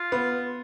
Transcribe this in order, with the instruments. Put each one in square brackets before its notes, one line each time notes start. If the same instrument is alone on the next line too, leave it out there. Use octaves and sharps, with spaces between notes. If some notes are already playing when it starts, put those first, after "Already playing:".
Already playing: [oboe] F4
[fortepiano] B3